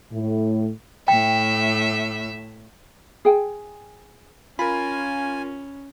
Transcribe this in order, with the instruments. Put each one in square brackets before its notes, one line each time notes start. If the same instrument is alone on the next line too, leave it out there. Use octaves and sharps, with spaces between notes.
[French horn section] A2
[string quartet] A2 E5 [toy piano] G5
[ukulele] G#4 G5
[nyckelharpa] C#4 [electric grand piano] F4 A#4 [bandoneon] G#5 [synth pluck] B5